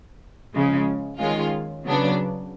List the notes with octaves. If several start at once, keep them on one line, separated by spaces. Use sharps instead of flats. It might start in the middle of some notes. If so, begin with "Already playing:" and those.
C#3 F3 G#3
D#3 G#3 C#4 F4
C#3 F#3 B3 D4